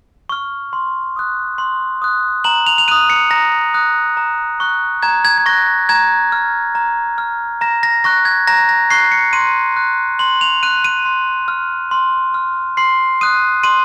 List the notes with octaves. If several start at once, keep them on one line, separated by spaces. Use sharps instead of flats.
C#6 F6
C6
D#6 F#6
C6
D#6 F#6
A#5 F#7
F7
F7
D#6 F#6 D#7
C#7
A#5 A#6
D#6 F#6
A#5
C#6 F#6
A#5 G#6
G#6
G#6
C#6 F#6 A#6
A#5 G#6
F6
A#5
F6
A#5 A#6
A#6
C#6 F#6 A#6
G#6
A#5 A#6
A#6
C#6 F#6 C7
C#7
C6 D#7
F#6
C6 F#7
F7
F#6 D#7
D#7
C6
F6
C6
F6
C6 C7
D#6 F#6 D#7
C6 D#7